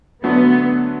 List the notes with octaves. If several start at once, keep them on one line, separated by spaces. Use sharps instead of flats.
D3 F#3 A3 B3